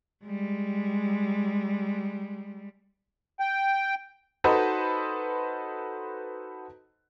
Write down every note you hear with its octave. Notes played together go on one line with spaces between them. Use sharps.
G3 G#3
G5
D#4 F#4 A4 B4 C5 D#5